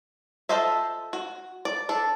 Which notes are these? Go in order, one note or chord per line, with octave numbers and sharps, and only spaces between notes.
F4 A4 C5 D#5 E5
F#4
D5
D4 A4